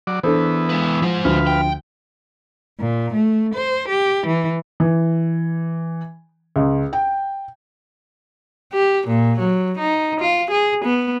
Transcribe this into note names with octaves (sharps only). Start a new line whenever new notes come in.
F#3 D5
E3 B3 D4 A4 C5
G#3 B4
F3 G#3 C5
D2 F3 B4 F5
G5
A#2
A3
C5
G4
E3
E3
C#2
G5
G4
A#2
F#3
D#4
F4
G#4
B3